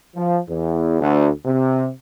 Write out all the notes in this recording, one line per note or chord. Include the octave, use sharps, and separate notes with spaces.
F3
E2
D2
C3